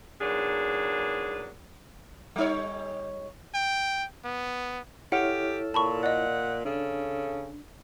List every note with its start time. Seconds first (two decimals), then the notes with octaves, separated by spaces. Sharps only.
0.21 E2 G#2 F#3 A#3 D4 G#4
2.36 G3 D#4 C#5
3.55 G5
4.25 B3
5.12 E4 G4 A4 C#5 F#5 F6
5.74 A#2 A5 B5 C#6
6.03 D5 D#5 F#5
6.65 C#3 D4 A4